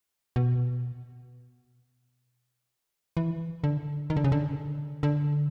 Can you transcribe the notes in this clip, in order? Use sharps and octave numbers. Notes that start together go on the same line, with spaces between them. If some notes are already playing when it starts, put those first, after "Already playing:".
B2
E3
D3
D#3
D3
C#3
D3
D3